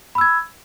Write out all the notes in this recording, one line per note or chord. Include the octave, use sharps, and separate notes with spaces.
B5 E6 G#6